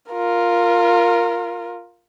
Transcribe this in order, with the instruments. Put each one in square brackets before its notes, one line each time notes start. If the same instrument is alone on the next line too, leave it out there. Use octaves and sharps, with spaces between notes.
[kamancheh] F4 A#4